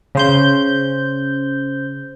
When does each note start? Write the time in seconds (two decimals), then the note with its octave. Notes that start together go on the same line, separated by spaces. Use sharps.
0.15 C#3 C5 G6